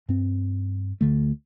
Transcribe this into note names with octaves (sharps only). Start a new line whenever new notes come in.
G2 C4
D2 D3 A3